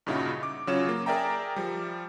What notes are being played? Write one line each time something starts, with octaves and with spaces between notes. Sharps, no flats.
G2 A#2 C#3 D#4 E4 F#4
D6
C#3 F#3 C#4 F4 C#5 E7
A#3
G#4 A#4 D5 E5 G5 A#5
F3 G3